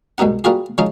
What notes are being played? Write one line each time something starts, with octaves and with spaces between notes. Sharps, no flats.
C2 G#2 B2 D#4 F#5
G3 A#3 F4 F#4 G#4
C#3 F3 G#3 C#4 D#4